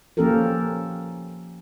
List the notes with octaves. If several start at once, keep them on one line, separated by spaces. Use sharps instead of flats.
F3 A#3 C#4 G4 A4 A#4